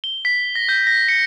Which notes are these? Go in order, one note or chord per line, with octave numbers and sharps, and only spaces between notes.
G7
B6
A#6
G6
A#6
C#7